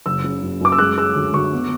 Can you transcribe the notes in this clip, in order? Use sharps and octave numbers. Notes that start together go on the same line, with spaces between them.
F#1 E6
C#3
F#2
F#2 D6
E6
G#3 F#6
G#3 E6
D2
D2 C#6
B3